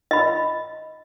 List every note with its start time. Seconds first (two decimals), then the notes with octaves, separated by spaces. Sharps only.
0.11 D#5 B5